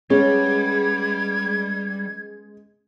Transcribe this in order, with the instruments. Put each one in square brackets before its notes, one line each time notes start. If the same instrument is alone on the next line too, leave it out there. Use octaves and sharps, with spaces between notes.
[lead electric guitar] G3 [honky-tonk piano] G#3 [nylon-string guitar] B3 C#4 [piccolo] G#6